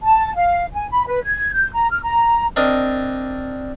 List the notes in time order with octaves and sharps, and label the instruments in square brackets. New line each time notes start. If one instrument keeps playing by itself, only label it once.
[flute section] A5
F5
G#5
B5
B4
G#6
G6
A#5
F6
A#5
[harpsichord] C4 D4 A#4 D#5